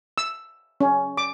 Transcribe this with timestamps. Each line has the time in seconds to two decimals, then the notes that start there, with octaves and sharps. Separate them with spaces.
0.18 E6
0.81 C#4
1.17 D6